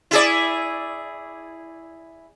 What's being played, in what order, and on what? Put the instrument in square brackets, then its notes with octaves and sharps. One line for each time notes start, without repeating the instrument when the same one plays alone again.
[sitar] E4 G#4 D5